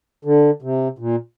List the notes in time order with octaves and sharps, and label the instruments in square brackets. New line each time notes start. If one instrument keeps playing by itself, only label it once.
[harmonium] D3
C3
A#2